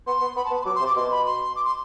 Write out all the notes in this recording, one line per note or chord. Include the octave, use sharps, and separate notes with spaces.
B3 C6
B3
B3 B5
A5
B3
A5
C6
F#3 D6
C6
C3
D6
B2 C6
B5
C6
D6
C6